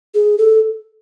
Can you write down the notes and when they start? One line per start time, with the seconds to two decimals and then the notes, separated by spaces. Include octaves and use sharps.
0.15 G#4
0.38 A4